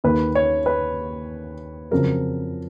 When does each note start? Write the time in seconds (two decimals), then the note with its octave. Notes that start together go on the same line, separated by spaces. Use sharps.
0.04 D#2 D#3 A#3 B4
0.35 C#5
0.66 B4
1.91 F2 C#3 F#3 A#4